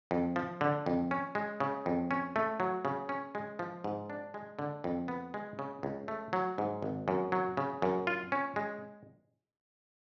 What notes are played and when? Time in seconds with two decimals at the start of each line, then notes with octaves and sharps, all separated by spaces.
0.11 F2
0.36 F3
0.61 D3
0.86 F2
1.11 C#4
1.35 G#3
1.60 C#3
1.86 F2
2.11 C#4
2.36 A3
2.60 F#3
2.85 C#3
3.09 C#4
3.35 G#3
3.59 F3
3.84 G#2
4.10 D4
4.34 G#3
4.59 D3
4.84 F2
5.08 B3
5.34 G#3
5.59 C#3
5.83 C#2
6.08 A3
6.33 F#3
6.58 G#2
6.82 G#1
7.08 F#2
7.32 F#3
7.57 C#3
7.82 F#2
8.07 F4
8.32 C#4
8.56 G#3